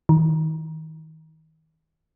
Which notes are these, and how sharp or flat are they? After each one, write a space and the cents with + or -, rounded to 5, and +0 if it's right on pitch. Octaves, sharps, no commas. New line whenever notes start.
D#3 +30